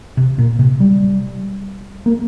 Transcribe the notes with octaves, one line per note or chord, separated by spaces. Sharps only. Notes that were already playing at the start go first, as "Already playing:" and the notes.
C3
A#2
C3
G3
A#3